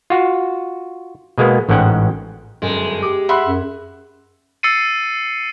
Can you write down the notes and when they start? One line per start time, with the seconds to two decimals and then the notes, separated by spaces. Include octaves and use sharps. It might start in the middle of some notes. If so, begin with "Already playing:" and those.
0.10 F4 F#4
1.38 B2 G#3 A#3 B3
1.69 A1 G#2 G#3 C#4 F#5 G5
2.62 G1 F#2 G#3
3.02 G4 D6
3.29 E5 F#5 B5 C6 F#6
3.47 F#2
4.63 E6 A6 C7 C#7 D#7